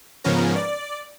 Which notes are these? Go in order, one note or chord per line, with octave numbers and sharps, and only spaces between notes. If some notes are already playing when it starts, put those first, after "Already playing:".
G#2 C#3 F3 B3 C#4 A#4
D5